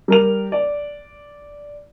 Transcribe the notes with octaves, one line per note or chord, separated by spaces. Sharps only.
G3 A#4 F7
D5